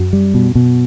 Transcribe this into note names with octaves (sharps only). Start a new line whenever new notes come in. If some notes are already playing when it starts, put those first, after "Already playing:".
Already playing: F#2
G3
B2
B2